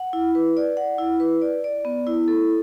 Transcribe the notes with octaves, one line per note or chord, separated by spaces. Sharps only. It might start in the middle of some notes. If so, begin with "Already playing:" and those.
Already playing: F#5
E4
B4
D5
F#5
E4
B4
D5
D5
B3
E4
A4